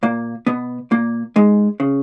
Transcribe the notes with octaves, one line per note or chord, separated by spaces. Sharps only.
A#2 A#3
B2 B3
A#2 A#3
G#2 G#3
C#3